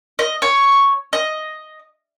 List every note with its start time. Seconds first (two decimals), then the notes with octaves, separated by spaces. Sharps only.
0.19 D#5
0.42 C#5
1.13 D#5